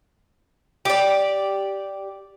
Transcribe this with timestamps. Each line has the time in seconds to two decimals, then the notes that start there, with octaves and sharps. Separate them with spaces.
0.85 G4 D5